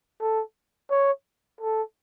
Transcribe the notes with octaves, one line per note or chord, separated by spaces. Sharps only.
A4
C#5
A4